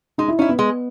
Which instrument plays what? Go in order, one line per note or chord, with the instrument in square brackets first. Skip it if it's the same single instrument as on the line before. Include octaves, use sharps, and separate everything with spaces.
[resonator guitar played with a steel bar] G#3 [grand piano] D#4
[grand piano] E4
[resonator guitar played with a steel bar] C#4 E4 [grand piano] D#4
[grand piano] B3
[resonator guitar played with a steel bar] G#3